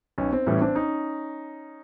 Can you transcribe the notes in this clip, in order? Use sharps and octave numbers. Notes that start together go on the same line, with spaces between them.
B1 C#4
C4
A2 E3 G3 C#4
C4 D4
C#4 D#4